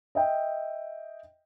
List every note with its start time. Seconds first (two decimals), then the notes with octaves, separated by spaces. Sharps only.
0.15 D#5 E5 G5